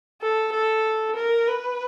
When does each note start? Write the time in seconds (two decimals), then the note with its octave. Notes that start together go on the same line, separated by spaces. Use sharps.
0.21 A4
0.53 A4
1.16 A#4
1.47 B4